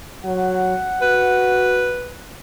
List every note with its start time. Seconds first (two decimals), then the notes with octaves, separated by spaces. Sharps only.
0.25 F#3 F#5
1.02 F#4 B4